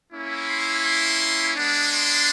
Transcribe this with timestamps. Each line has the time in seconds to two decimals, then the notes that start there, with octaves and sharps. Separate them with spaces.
0.12 A#3 C#4 E4
0.49 C6
0.85 C6
1.57 G#3 B3 D4
1.93 C6